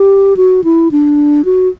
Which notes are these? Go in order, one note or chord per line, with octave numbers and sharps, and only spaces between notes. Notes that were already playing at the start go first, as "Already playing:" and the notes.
Already playing: G4
F#4
E4
D4
F#4